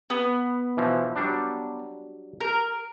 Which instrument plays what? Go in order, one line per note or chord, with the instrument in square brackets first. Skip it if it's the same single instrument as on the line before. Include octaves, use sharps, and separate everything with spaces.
[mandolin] B3
[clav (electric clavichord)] B2 E3 F3
F#3 G3 D4
[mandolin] A#4